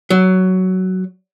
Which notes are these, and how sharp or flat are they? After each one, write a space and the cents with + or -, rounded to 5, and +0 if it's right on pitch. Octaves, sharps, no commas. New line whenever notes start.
F#3 +10